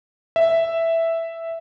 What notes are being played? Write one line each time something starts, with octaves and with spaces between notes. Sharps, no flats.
E5